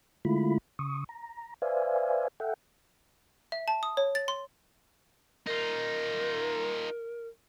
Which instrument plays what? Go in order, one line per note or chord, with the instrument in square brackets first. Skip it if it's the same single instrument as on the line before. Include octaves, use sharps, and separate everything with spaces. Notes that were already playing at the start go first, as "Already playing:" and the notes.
[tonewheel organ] D3 G#3 A3 E4 F4 B5
C#3 C#6 D#6
A#5
B4 C5 D5 E5 F5 G#5
A4 E5 F#5 G5
[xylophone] E5
A5
D#6
C#5
A6
C6
[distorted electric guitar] D#4 F4 [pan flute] A#4